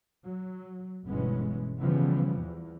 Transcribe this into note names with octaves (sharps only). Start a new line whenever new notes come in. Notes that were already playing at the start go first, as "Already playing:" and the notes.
F#3
G1 B2 E3 G#3 B3 C#4
C#3 E3 F3 G3 B3
E2